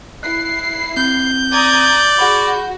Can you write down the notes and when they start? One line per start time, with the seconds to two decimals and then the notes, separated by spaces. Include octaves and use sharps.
0.23 E4 F#6 C7
0.97 C4 G6
1.52 D5 A#5 D#6 G#6
2.19 F#4 G#4 B5